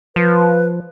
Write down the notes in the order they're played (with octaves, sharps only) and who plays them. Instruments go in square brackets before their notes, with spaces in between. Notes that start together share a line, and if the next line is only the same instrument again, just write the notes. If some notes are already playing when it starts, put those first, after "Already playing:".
[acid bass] F3 [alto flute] B4